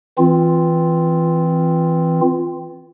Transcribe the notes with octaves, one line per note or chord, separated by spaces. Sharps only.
E3 C4 F4